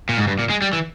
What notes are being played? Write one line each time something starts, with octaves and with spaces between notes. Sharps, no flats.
A#2
G#2
G2
A#2
G#3
G3
E3